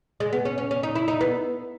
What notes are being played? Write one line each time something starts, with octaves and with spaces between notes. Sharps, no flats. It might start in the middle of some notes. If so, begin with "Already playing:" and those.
G#3
B3
C#4
C#4
C#4
D#4
E4
D#4
B3